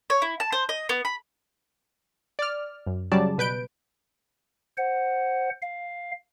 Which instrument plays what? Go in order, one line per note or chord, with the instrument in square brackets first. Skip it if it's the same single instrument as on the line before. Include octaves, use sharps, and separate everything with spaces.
[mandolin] C#5
E4
A5
C5
D#5
B3
B5
[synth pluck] D5 F6
F#2
C#3 F#3 G3 D5 A5
B2 B4 G6 D7
[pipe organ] C5 F#5
F5